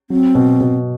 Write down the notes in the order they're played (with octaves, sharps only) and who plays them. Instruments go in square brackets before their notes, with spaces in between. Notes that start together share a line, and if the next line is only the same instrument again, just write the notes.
[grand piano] F#3 [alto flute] C4
[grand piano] B2
B2